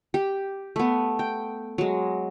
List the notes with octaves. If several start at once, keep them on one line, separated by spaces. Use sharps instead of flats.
G4
A3 B3
G5
F#3 G#3